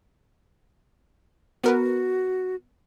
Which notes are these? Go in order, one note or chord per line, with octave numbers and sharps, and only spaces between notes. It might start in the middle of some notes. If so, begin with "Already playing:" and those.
B3 F#4 A#4 B4